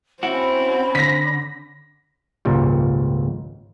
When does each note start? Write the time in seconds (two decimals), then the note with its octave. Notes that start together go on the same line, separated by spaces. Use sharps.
0.23 C4 C#4 E4 F#4 B5
0.95 D3 A#6 B6
2.45 G#1 C#2 A#2 F#3 G3